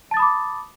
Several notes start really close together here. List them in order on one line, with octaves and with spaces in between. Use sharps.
A5 A6 D#6 B5 D6